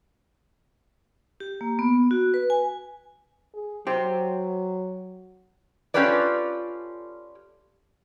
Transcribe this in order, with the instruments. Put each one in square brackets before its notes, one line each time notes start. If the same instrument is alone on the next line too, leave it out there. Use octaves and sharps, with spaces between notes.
[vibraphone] G4
A#3
B3
F#4
B4
G#5
[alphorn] G#4
[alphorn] F#3 [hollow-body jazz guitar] G4 C5
[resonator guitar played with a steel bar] C#4 F4 G4 A4 B4 D5